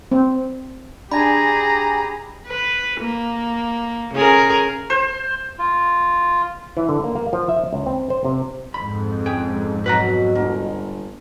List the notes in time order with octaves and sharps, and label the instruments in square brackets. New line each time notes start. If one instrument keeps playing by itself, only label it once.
[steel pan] C4
[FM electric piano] D4 G#5 [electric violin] G4 G#4 [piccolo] A#5 [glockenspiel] B5
[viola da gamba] B4
A#3
C#3 G#4 A#4
[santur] C5
[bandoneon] F4
[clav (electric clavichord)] E3
D3
A#3
A#3
F3
E5
C#2
C4
C5
C3
[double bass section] F2 G#2 [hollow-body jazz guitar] B5
[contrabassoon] C#2 [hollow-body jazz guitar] G#4 G5
[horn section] B2 [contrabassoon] F#3 [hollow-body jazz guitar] B4 F#5 A#5
[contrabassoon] G1 [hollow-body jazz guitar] A#3